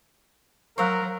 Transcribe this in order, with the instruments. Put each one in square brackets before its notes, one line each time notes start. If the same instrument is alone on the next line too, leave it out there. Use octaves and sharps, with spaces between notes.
[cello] F#3 [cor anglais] A#4 [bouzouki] C5 F5 [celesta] C#6 E6 F#6